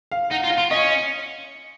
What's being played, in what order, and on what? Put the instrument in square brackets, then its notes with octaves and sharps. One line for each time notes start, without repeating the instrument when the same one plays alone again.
[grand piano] F5
[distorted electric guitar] D#4 [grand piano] F#5
[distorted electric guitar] F4
[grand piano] F5
[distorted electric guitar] F4
[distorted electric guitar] C#4 [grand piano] D#5